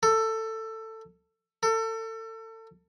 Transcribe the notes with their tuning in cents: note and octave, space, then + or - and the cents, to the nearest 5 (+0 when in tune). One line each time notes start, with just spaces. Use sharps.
A4 +15
A4 +30